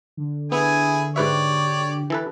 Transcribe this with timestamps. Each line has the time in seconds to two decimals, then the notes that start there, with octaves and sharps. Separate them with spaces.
0.17 D3
0.52 B3 E4 G#4 G#5
1.16 G#2 G4 B4 C#5 D5 E5
2.10 E3 A4 B4